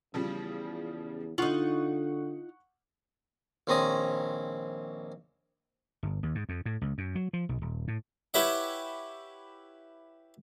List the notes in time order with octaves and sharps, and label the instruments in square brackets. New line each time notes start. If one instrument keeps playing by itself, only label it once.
[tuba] E2 [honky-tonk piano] C#3 F3 G3
[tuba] D3 [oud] D#4 F4 [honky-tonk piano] F#5 C#6 F#7
[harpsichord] A#1 D#3 C4 C#4 A#5 D#6
[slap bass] G1
D#2
G#2
F2
A2
C#2
F#2
F#3
F3
B1
D#1
A2
[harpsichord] E4 G4 B4 C#5 E5 F#5